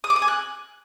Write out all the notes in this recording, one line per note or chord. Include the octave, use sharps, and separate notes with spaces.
D#6
D6
D#6
G#5
F#6